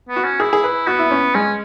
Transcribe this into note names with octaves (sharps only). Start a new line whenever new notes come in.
B3
F#4
C#4
E4 G#4
G#4
B4
B3 F#4
E4
C#4
G#3 C#4